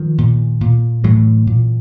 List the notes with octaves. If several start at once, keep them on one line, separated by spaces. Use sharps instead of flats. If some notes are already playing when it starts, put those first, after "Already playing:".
Already playing: D#3 F3
A#2
A#2
A2 E3 F#3
A#2